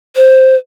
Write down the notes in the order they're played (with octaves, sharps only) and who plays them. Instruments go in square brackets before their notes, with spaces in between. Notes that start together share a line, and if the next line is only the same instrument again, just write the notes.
[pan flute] C5